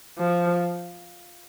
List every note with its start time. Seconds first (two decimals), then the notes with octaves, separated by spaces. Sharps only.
0.19 F3